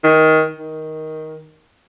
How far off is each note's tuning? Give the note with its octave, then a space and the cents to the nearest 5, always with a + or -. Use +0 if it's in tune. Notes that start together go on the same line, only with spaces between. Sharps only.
D#3 +20
D#3 +10